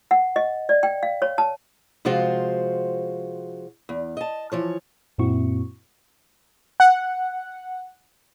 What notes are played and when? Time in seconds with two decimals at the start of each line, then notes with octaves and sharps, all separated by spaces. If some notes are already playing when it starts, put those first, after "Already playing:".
0.11 F#5
0.36 D#5
0.69 D5
0.83 G5
1.03 F5
1.22 C#5
1.38 A5
2.05 C3 F3 G#3 F4 F#4 C5
3.89 E2
4.17 D#5 A5
4.52 E3 F3 C#5
5.18 F#2 A#2 C4 E4 F#4 C#6
6.80 F#5